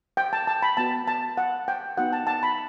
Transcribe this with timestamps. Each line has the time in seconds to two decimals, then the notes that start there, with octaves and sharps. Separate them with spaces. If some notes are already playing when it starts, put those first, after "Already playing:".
0.17 G5
0.33 A5
0.47 A5
0.63 B5
0.77 B3 F#4 A5
1.07 A5
1.37 F#5
1.68 G5
1.98 B3 D#4 F#4 F#5
2.13 A5
2.27 A5
2.43 B5